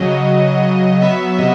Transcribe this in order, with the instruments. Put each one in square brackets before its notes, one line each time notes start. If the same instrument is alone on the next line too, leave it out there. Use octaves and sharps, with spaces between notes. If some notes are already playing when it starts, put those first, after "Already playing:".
Already playing: [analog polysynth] C#3 F#3 D#5
C#3
F#3
B3 E5
C3 D#5